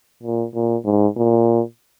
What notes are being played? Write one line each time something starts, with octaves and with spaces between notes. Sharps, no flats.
A#2
A#2
G#2
A#2